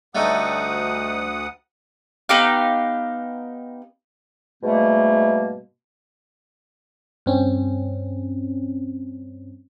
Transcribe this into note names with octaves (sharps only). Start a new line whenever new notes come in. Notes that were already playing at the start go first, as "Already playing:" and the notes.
D2 G3 A3 D#4 F#5 D#6
B3 D#4 G4 F5
G#2 B2 G3 A3 A#3
G2 C4 C#4